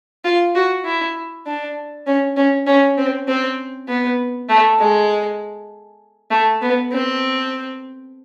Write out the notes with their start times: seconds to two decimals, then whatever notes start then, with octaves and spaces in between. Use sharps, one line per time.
0.24 F4
0.55 F#4
0.85 E4
1.46 D4
2.07 C#4
2.37 C#4
2.67 C#4
2.97 C4
3.28 C4
3.88 B3
4.49 A3
4.79 G#3
6.31 A3
6.62 B3
6.91 C4